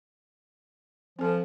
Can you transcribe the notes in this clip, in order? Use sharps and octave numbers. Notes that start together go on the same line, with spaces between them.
F3 C4 A4